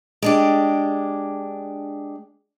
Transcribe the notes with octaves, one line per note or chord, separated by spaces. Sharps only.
G#3 D4 G4